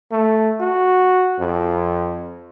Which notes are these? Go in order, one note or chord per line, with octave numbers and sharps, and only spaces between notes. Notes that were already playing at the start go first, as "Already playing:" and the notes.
A3
F#4
F2